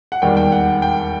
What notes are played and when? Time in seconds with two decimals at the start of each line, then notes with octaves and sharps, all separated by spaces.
0.12 F#5
0.22 E1 D#2 D#3 G3 G5
0.37 G5
0.52 F#5
0.82 G5